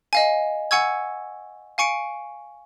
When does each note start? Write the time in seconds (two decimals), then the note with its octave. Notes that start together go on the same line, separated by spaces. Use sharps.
0.13 D#5 F5 G#5
0.71 F#5 G#5 C#6 E6 G#6
1.78 F5 G#5 C#6 C#7 D7